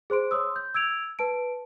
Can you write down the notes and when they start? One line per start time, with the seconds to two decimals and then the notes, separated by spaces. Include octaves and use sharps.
0.10 G#4 C5 C6 D7
0.31 C#5 C6 D#6 E6
0.56 G6
0.74 E6 G#6 D7 F7
1.19 B4 A5 D7